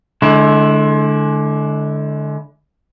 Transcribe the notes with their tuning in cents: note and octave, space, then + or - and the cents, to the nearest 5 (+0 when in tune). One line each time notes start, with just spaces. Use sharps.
D3 +0 G#3 +35 E4 +0